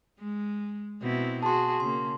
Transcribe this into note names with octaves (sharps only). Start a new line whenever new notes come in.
G#3
B2 C4 E4
F#4 G#4 A5 C6
C#3 A#3 C6